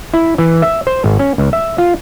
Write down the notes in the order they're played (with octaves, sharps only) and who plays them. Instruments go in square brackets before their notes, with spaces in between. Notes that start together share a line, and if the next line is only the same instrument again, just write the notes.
[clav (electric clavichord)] E4
E3
E5
C5
G#1
C#4
C#2
E5
F4